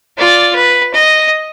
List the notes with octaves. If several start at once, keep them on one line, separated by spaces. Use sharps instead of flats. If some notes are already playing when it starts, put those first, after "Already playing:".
F4 D5
B4
D#5